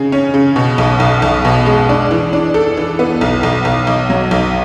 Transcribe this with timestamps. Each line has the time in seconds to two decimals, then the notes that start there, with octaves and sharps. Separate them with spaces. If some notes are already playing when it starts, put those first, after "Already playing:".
Already playing: C#3 G#4
0.12 C#4
0.34 C#3
0.56 B2
0.78 B1
1.00 B1
1.22 B1
1.45 B2
1.66 G#3
1.89 D4
2.11 E3
2.33 D4
2.54 A4
2.77 E3
2.99 B3
3.21 B1
3.43 B1
3.65 B1
3.87 B1
4.10 F#3
4.31 B1